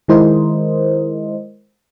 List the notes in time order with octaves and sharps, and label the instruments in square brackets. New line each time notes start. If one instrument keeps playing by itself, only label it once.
[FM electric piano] D#3 G#3 E4 A#4 C5 D#5